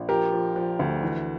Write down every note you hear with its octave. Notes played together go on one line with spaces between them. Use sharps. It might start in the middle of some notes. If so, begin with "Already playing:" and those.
Already playing: A#1
F3 G4 A#4
F3
F3
D2
E3